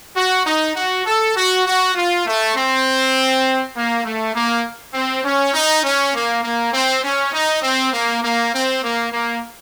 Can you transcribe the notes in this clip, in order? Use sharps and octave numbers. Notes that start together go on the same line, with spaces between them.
F#4
D#4
F#4
A4
F#4
F#4
F4
A3
C4
A#3
A3
A#3
C4
C#4
D#4
C#4
A#3
A#3
C4
C#4
D#4
C4
A#3
A#3
C4
A#3
A#3